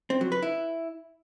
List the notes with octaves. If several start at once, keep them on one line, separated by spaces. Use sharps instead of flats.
C4
F#3
B4
E4